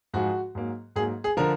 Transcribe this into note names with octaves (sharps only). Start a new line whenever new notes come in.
G#2 F3 G#3 F#4
G#2 F#3 A#3
G#2 F#3 A#3 G#4
G#4
D3 F3 A#4